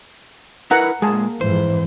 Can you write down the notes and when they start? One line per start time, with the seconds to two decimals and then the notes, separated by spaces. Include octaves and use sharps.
0.71 E4 A#4 B4 F#5 A#5
1.02 A#2 G#3 A#3 G#4 A5
1.41 F2 G#2 E3 C5